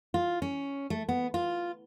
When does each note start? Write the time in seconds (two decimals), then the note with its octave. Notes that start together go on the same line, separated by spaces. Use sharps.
0.14 F4
0.42 C#4
0.90 A3
1.09 B3
1.34 F4